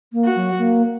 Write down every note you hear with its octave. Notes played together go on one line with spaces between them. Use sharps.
A#3
F#4
F#3
A#3